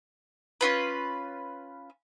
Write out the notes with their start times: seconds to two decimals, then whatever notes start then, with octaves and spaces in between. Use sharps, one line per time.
0.61 C#4 F4 B4